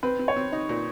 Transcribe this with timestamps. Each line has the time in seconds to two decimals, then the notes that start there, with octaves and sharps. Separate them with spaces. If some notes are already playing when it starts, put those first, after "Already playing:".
0.03 C4 B4
0.19 C4
0.28 C#5
0.36 C4
0.52 D#4
0.69 A#2